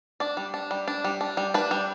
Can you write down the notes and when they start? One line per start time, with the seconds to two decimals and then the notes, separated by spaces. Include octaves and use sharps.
0.20 D4 D5
0.37 G3
0.54 D4
0.71 G3
0.88 D4
1.04 G3
1.21 D4
1.37 G3
1.54 D4 B4
1.71 G3